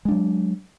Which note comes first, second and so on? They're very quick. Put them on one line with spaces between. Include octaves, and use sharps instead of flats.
G#3 D4 F#3